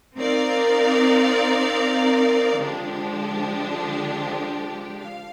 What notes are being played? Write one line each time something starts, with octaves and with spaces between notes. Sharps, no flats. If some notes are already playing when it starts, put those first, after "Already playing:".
C4 D#4 A#4 D5 F5
D3 F3 G#3 D4 G4
F5